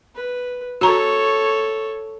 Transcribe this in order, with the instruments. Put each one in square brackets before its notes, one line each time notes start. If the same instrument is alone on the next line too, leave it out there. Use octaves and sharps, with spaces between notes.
[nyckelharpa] B4
[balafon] F#4 A#5 [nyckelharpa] A4 C#5